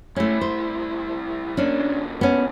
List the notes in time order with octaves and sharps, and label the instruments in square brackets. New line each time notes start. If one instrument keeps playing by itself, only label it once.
[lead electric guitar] C2 E4 [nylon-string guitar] A3 C#4
[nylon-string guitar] C5
[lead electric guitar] F#2 A#3 [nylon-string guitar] C#4 D4
[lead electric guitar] A#2 C#3
[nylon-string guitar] B3 C#4